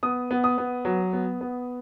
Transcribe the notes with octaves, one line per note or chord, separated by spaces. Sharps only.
B3 D#6
B3
D#6
B3
F#3
B3
B3